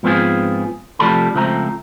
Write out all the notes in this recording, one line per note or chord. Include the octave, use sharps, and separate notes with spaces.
G#2 F3 B3 C4 F4 G#4
C2 F3 G3 A3 A4 B5
C#2 F3 A3 C4 A#5